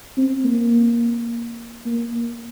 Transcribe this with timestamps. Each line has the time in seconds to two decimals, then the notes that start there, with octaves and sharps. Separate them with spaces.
0.17 C4
0.44 A#3
1.86 A#3